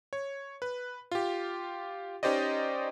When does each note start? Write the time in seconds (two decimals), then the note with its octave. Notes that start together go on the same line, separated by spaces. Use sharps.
0.13 C#5
0.62 B4
1.12 F4 G4
2.23 C#4 D#4 G4 C5 D5 D#5